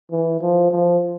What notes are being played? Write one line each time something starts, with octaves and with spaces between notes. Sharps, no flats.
E3
F3
F3